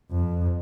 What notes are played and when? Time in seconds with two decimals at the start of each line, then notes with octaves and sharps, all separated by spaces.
0.11 F2